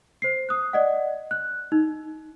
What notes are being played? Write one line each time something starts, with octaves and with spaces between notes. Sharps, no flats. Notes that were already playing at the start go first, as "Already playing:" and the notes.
C5 C7
D#6 F#6
D5 D#5 F#5
F#6
D#4